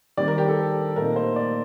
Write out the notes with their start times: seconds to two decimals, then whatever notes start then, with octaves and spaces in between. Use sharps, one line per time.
0.17 D#3 G3 C4 D5
0.28 A#4
0.38 G4
0.48 A4
0.96 A#2 A3 C4 D#4 A#4
1.16 C5
1.36 D5